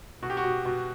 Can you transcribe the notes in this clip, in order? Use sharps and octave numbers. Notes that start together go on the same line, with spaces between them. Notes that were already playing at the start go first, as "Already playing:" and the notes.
B2 F#4
G4
F#4
B2
B2